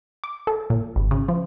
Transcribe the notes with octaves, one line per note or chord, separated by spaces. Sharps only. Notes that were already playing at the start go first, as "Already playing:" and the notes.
D6
A4
A#2
G#1
C#3
F3